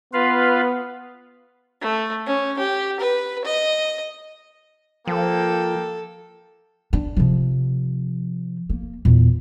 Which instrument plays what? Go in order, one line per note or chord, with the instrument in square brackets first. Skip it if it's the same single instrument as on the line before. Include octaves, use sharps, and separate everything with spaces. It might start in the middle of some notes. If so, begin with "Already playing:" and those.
[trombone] B3 [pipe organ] F4 B4 F5
[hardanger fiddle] A3
C#4
G4
B4
D#5
[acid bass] F3 [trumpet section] A#3 G5 [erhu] A4
[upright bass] D4
C3 F3
A#3
E2 A#2